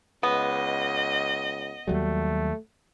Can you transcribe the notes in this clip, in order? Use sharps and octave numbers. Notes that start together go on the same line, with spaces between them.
C#2 B3 D#5
D#2 F#3 G3 A3